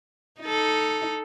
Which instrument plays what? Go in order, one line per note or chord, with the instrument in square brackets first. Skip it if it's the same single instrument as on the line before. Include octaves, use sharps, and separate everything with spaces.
[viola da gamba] D#4 A4